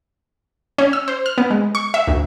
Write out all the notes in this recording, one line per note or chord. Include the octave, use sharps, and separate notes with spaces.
C#4
E6
C5
F6
B3
G#3
C#6
E5
D2